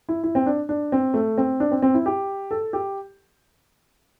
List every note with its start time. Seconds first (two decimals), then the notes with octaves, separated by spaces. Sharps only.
0.09 E4
0.23 E4
0.35 C4
0.46 D4
0.69 D4
0.92 C4
1.14 A3
1.38 C4
1.60 D4
1.71 C4
1.82 C4
1.94 E4
2.06 G4
2.51 A4
2.73 G4